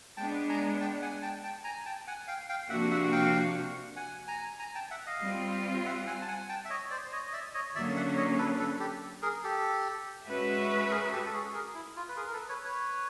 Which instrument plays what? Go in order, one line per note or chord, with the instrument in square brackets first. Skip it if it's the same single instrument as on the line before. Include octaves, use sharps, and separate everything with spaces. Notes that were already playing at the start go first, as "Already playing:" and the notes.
[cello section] G#3 B3 D4 [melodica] G5 A5
[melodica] G#5 A#5
G5 A5
F#5 G#5
G5 A5
G5 A5
G#5 A#5
G5 A5
F#5 G#5
F5 G5
F5 G5
[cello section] C3 F3 A#3 D4 F#4 [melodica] E5 F#5
[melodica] E5 F#5
F5 G5
F#5 G#5
G#5 A#5
G#5 A#5
G5 A5
E5 F#5
D#5 F5
[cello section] G3 C4 F4
[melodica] E5 F#5
F#5 G#5
A5
F#5 G#5
G5 A5
E5
C#5 D#5
C5 D5
C#5 D#5
D#5
D5 E5
C#5 D#5
[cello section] D3 F#3 A#3 C#4 [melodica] D5 E5
[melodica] E5 F#5
C#5 D#5
A4 B4
A4 B4
G4 A4
G#4 A#4
G4 A4
[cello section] G#3 C#4 F#4 B4 E5
[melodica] G#4 A#4
G4 A4
A4
F#4 G#4
G#4 A#4
E4
F4
B4
G#4 A#4
A#4
A4 B4
B4 C#5
B4 C#5